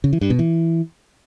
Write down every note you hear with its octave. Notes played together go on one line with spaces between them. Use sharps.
C#3
E3
G2
B2
E3